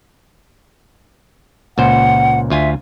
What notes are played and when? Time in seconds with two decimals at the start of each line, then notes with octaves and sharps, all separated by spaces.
1.78 C#2 A#2 C5 F#5
2.50 D2 F4 E5 G#5